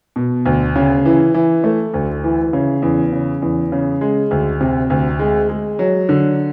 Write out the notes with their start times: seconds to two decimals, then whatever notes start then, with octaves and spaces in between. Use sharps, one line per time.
0.16 B2
0.46 D2
0.75 C#3
1.05 E3
1.34 E3
1.64 A3
1.94 D2
2.24 E3
2.53 C#3
2.82 E2
3.12 C#3
3.42 E2
3.72 C#3
4.01 G#3
4.31 D2
4.61 C3
4.90 D2
5.19 G#3
5.49 G#3
5.79 F#3
6.09 D3